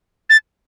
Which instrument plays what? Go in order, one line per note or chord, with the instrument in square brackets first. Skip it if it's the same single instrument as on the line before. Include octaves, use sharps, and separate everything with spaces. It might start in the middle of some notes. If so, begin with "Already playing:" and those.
[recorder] A6